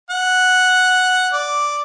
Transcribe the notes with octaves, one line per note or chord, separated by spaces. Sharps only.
F#5
D5